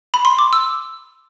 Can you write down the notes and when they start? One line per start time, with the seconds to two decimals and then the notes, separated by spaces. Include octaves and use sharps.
0.14 B5
0.25 C6
0.39 D6
0.53 E6